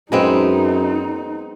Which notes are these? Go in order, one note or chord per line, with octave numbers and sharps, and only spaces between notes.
F#2 G#3 B3 C4 D#4